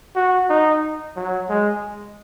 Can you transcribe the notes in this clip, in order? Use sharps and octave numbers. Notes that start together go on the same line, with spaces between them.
F#4
D#4
F#3
G#3